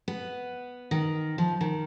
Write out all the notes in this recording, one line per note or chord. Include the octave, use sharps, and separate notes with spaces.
B3
D#3
F3
D#3